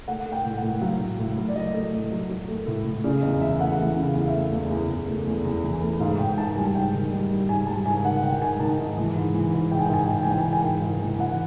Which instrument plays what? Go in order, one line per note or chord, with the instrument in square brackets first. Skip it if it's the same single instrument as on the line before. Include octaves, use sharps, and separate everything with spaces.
[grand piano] A3 F#5
A3
G5
A2
F#5
A2
F#3 F5
A2
A2
F#3
D5
F#3 D#5
A3
A2
F#3
F#3
A3
A2
A2
C#3 D5
E2 D#5
E3 E5
A3 F#5
E3
C#3
F5
E2
F5
E5
A3
E2
E2
E2
A3
E2
E2
E3
A3
G#2 F5
G#2 G5
G#2 A5
G3 G#5
G#2 G5
D#3
G3
G3
G#2 G#5
G3 A5
G#2 G#5
D#3 F#5
D#3 G5
G#2 G#5
D#3 A5
G#2
E3
G#2
E3
G#2
G#2 G5
G#5
G5
G#2 G#5
G5
G#2 G#5
G5
G#5
E3 G5
G#5
G#2 G5
G#5
G#2 G5
G#2
E3
E3 F#5